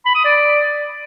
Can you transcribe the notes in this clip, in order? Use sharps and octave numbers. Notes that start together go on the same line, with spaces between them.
B5
D#6
D5